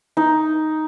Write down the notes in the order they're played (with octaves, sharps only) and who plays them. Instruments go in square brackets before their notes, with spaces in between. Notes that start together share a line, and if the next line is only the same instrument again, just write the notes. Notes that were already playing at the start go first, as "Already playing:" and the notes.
[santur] D#4